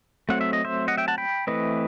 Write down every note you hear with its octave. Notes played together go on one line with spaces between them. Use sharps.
F#3 A3 C4 F#5
E5
D#5
C5 E5
D#5 F#5
E5 G5
F#5 A5
G5 B5
E3 A3 C4 B4 D#5